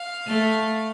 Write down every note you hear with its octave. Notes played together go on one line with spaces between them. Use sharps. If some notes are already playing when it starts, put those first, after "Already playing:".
Already playing: F5
A3